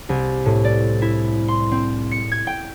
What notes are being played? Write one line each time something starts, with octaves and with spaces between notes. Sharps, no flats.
C2
A2
D5
E4
C6
C4
C#7
G#6
G5